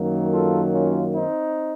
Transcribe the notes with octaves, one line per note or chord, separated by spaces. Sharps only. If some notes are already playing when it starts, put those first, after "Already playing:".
Already playing: F#2 D#3 F#3 A#3
F4 A4
C#4 F4
C4 D#4